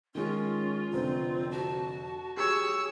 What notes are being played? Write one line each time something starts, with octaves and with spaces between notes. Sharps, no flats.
D#3 G#3 C#4 F4
F1 D3 C4
F#4 A5
G4 G#4 C#5 E6